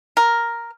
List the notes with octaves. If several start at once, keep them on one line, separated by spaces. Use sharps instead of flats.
A#4